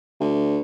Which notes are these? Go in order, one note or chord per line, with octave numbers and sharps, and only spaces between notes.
D2